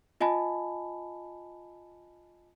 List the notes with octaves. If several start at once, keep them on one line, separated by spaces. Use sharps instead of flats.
F4 D#5 G#5 A5 B5